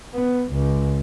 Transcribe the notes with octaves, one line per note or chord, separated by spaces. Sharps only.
B3
C#2